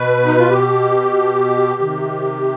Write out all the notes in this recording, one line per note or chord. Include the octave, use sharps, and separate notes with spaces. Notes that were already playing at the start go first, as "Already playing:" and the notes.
Already playing: B2 B4
D#4
F4
G4
C3 D#3